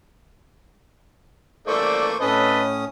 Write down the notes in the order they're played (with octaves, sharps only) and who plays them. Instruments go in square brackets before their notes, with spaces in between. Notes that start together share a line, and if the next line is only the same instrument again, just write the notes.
[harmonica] E3 A3 A#3 [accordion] C5 C#6 [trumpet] D5
[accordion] A2 C#4 D#6 [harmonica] A4 D#5 [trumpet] B4